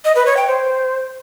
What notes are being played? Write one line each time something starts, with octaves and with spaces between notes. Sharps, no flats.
D#5
B4
C#5
G5
C5